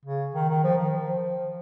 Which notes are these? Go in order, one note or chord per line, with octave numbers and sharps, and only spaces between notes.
C#3
D#3
D#3
F3
D#3
F3